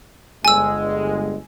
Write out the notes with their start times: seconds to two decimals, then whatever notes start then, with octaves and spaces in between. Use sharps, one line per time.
0.45 G1 G#3 G#5 E6